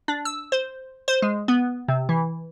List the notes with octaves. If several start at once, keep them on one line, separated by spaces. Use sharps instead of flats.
D4
E6
C5
C5
G#3
B3
C3
E3